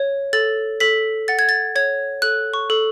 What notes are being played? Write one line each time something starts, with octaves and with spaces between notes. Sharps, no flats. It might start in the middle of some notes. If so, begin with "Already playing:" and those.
Already playing: C#5
A4 A6
A4 B6
F#5 A6
G#6
A6
C#5 G#6
A4 F#6
C#6
A4